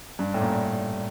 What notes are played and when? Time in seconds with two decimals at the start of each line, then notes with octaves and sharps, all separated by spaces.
0.19 G2
0.34 A2
0.41 A#2